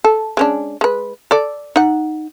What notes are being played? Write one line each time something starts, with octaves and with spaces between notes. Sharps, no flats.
A4
G#3 C#4 D4
G#3 B4
A4 D5
D#4 F#5